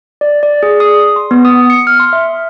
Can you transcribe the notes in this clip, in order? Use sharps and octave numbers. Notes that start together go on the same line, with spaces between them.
D5
D5
G#4
D#6
C6
B3
D#6
C#7
F6
C6
E5